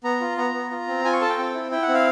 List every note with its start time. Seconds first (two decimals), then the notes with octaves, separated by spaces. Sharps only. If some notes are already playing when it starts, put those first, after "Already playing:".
0.04 B3 A#5
0.21 F4
0.37 B3 A#5
0.54 B3
0.71 F4
0.88 C4
1.04 F4 G#5
1.13 C#6
1.21 A4 A5
1.29 G5
1.38 C4
1.54 E4
1.71 E4 G5
1.83 F#5
1.89 C4
1.94 F5